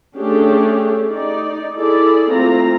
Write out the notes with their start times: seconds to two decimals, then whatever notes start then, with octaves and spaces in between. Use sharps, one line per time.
0.16 A3 C#4 D4 G4 G#4
1.09 D#4 D5
1.75 E4 G#4 A4 D5
2.30 A3 C4 F4 A#5